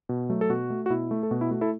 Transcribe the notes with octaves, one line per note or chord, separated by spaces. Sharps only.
B2
F#3 A3
A4
B2 F#4
A3
F#4
B2 E4
A3
A4
B2 F#4
E4
A3 F#4
E4 A4